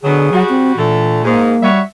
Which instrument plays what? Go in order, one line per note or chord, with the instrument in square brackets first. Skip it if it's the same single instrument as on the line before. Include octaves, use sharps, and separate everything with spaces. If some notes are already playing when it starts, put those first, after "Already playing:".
[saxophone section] B2 F#3 [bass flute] D3 [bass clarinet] G#4
[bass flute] F#3 [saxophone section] G3 F#4
[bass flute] C4
[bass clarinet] A#2 [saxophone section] D3 A3 [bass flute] E3
[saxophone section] G#2 [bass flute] A#3
[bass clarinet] G3 [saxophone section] F#4 C#5 E5